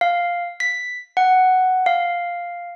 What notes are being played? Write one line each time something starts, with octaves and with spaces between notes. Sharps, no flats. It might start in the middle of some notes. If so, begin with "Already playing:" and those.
F5
B6
F#5
F5